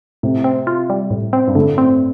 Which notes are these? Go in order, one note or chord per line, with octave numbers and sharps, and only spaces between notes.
A2 C3
C4
F4
G3
A2
C4
G2
A2 D3
C4